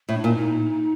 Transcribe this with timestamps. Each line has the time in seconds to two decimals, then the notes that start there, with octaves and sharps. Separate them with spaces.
0.09 A2
0.14 D4
0.24 A#2
0.35 D#4